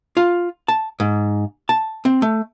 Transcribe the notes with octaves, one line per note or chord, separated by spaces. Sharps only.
F4
A5
G#2
A5
C4
A3